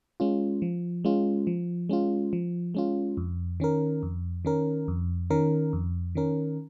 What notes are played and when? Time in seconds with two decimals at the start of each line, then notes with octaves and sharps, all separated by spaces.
0.20 G#3 C#4 F4
0.62 F3
1.05 G#3 C#4 F4
1.47 F3
1.89 G#3 C#4 F4
2.33 F3
2.74 G#3 C#4 F4
3.17 F2
3.60 D#3 C#4 A#4
4.03 F2
4.45 D#3 C#4 A#4
4.88 F2
5.30 D#3 C#4 A#4
5.73 F2
6.15 D#3 C#4 A#4